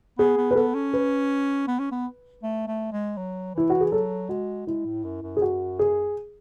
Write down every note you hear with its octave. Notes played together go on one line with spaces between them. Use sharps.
B3 G#4
B3
B4
B3 A4
C#4
B4
B3
C#4
B3
A3
A3
G#3
F#3
E3 E4
F#4
G#4
F#3 A4
G#3 F#4
G#3 E4
A2
F#2
F#2
G#4
F#4
G#4